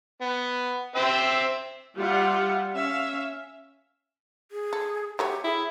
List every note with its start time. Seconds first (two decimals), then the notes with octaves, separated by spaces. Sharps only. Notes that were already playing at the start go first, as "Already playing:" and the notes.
0.21 B3
0.96 C4 C5 E5
1.96 G3 F4 G4 E5 F#5
2.73 C#4 E5 F5
4.51 G#4
4.73 A4
5.19 F#3 A3 G4 C#5
5.44 E4 G#4